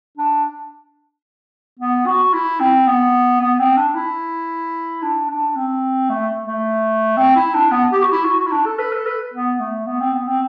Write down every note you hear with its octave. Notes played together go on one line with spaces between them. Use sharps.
D4
B3
F#4
E4
C4
B3
B3
C4
D4
E4
D4
D4
C4
A3
A3
C4
E4
D4
B3
G4
F#4
E4
F#4
F#4
E4
D4
A4
B4
A4
B4
B3
A3
B3
C4
B3
C4